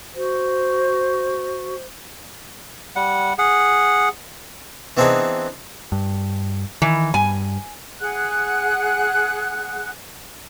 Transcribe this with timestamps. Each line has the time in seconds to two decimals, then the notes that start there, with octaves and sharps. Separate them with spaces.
0.15 F#4 C5
2.96 G3 F#5
3.38 G#4 F#5
4.97 E3 B3 C4 D4 D#4 G#4
5.92 G2
6.82 D#3 E3
7.14 G2 G#5
8.01 G#4 F#5 F#6